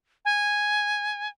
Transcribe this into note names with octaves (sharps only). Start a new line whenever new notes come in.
G#5